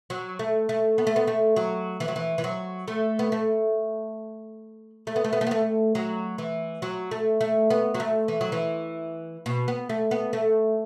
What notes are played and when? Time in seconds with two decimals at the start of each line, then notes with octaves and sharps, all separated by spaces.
0.10 F#3
0.39 A3
0.69 A3
0.98 B3
1.07 A3
1.16 B3
1.27 A3
1.56 F#3
2.00 E3
2.08 F#3
2.16 E3
2.38 E3
2.44 F#3
2.88 A3
3.19 B3
3.32 A3
5.07 A3
5.16 B3
5.24 A3
5.33 B3
5.41 A3
5.47 B3
5.51 A3
5.95 F#3
6.38 E3
6.82 F#3
7.11 A3
7.41 A3
7.70 B3
7.94 F#3
8.00 A3
8.28 E3
8.41 F#3
8.52 E3
9.46 B2
9.68 B3
9.89 A3
10.11 B3
10.33 A3